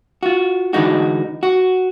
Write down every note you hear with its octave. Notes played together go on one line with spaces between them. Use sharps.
F4 F#4
D3 E3 G#3 D#4 F#4
F#4